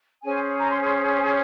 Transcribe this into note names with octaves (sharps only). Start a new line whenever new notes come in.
C#4 G#4 C5 G#5
A#5
C6
C6